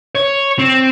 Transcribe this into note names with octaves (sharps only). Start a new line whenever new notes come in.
C#5
C4